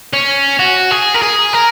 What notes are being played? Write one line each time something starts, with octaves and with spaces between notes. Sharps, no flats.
C#4
F#4
G#4
A#4
G#4
A#4